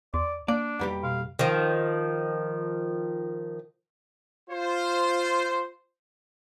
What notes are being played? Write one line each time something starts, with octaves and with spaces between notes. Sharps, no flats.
E2 D5 C6
A#3 D4 D5
B1 F2 G3 G4 B4
B2 F5
D#3 F3
F4 C5